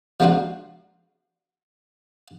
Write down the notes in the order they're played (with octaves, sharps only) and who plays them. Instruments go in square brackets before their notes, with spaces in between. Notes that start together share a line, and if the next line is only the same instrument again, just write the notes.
[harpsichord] F3 G#3 A#3 D4 F4 F#4